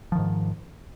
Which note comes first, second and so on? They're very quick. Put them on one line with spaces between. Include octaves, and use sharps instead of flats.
F3 D#3 G#2